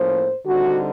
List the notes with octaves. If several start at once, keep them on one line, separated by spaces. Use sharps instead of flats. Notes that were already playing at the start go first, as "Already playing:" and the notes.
Already playing: A2 F3 A#3 C#4 C5
D3 G3 C4 D#4 F#4